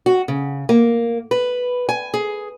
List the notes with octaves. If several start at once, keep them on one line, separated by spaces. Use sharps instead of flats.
F#4
C#3
A#3
B4
G#5
G#4